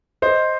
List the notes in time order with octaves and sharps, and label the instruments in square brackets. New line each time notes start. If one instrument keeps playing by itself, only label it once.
[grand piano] C5 D#5